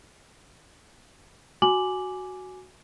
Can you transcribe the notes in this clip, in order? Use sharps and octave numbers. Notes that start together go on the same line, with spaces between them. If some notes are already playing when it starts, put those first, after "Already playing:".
F#4 G#5 D6 F#7